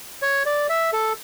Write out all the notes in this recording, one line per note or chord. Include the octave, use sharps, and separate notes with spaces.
C#5
D5
E5
A4